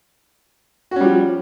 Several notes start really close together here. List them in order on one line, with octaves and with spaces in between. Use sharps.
F#4 C#4 G3 F3